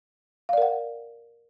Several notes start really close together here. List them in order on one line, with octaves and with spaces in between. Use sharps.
F5 D5 A#4 F#5